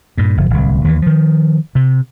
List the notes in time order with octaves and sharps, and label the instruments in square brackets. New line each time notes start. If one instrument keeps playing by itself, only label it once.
[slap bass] G2 A#2
F#1 F3
D1 C2
D#2 E3
D#3 F3
C3